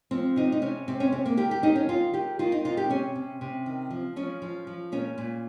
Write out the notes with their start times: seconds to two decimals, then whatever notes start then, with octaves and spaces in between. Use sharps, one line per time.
0.11 F3 C4
0.36 C3 D#4
0.52 D#4
0.62 C3 C#4
0.88 C3 C4
1.00 C#4
1.12 C3 C4
1.26 A#3
1.37 D#3 G4
1.51 G4
1.63 D#3 D#4
1.75 C#4
1.89 D#3 F4
2.14 D#3 G4
2.39 D#3 F4
2.52 D#4
2.65 C3 F4
2.77 G4
2.90 C3 C#4
3.15 C3
3.41 C3
3.66 D#3
3.91 F3
4.16 F3 C#4
4.42 F3
4.67 F3
4.92 A#2 C#4
5.18 A#2